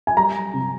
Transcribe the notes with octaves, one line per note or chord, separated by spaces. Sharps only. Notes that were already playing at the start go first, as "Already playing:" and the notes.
G#5
G3 A#5
C3